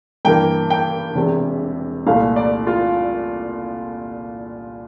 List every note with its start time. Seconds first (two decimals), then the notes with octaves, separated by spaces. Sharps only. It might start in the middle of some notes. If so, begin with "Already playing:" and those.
0.25 G2 E3 A#3 G5
0.70 G5
1.15 E1 E2 C3
2.06 C2 A#2 A3 F5
2.36 D5
2.67 F4